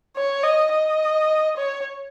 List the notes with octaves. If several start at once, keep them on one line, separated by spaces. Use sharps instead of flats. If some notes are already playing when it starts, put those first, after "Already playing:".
C#5
D#5
D#5
C#5